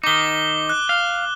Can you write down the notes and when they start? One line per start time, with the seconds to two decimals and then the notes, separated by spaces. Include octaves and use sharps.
0.04 D#3 D#4 D6 G7
0.69 F#6
0.89 F5